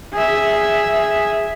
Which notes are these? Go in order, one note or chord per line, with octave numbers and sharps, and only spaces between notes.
G#4 E5